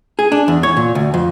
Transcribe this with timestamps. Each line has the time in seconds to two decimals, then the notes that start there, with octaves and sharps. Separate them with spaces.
0.19 G#4
0.32 D4
0.48 E2
0.63 C#5
0.77 A#2
0.95 D2
1.14 F2